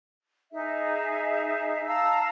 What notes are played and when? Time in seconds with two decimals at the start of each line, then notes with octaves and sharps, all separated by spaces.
0.52 D#4 G#4 E5
1.86 F5 A5 A#5 E6